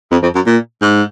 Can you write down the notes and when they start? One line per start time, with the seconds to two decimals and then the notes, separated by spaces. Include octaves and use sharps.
0.12 F2
0.23 F2
0.35 F#2
0.47 A#2
0.82 G#2